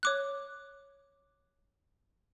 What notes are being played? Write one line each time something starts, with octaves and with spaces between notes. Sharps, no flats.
C#5 D6 F#6